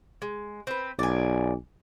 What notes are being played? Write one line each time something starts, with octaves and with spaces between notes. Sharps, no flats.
G#3
C4 B4
B1 D5 G#5